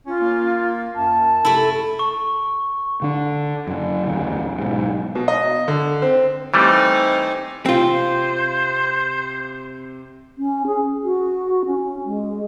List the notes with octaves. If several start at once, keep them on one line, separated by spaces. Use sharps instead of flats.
C#4 F4
A#3
F#2 A5
C3 A3 E4
C#6
D3 D4
F#2 C#3
D1 E2 C#3
B1 G#2
B2
D#5
D3
C4
E3 G3 A3 C4 D#4
C3 C4 F4 C5
C#4
G#4
F#4
C#4
G#3